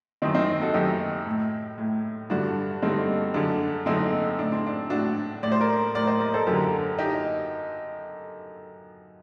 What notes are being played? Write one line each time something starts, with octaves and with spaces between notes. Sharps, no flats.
F#2 D#3 C4 D#4
C4 D#4
F#4 A4
F#2 D#3 D#4 G4
A2
A2
G2 D3 D4 F#4
G2 D3 C4 D#4
F#2 D3 D4
F#2 D3 C4 D#4
A2 D4
C4
D4
A2 D4 F#4
A2 D5
C5
A#4 D5
A2 A#4 D5
C5 D#5
A#4 D5
A4 C5
F#2 D3 G4 A#4
D#4 G4